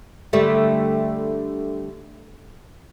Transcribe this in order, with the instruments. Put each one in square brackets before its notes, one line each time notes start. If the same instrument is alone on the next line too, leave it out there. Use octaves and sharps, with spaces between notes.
[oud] D3 G3 A3